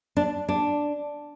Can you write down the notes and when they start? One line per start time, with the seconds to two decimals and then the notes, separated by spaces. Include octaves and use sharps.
0.17 D4
0.49 D4